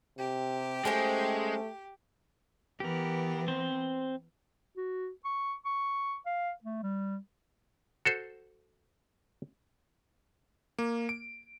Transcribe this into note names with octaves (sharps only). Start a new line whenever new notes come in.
C3 G4
G#3 A3 C#4 C5 G5
E3 B3 G4 A#4
C4 C5
F#4
C#6
C#6
F5
A3
G3
F#4 A4 C5
A#3
D7